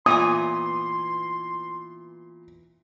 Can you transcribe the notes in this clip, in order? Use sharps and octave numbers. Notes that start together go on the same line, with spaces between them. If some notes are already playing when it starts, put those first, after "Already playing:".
A#2 E3 B3 G#5 C6 D#6